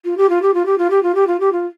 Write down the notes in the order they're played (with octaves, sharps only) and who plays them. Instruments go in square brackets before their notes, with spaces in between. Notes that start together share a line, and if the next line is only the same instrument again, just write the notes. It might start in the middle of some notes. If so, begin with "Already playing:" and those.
[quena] F4
G4
F4
G4
F4
G4
F4
G4
F4
G4
F4
G4
F4